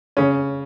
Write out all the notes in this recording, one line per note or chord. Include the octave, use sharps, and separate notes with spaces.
C#3 C#4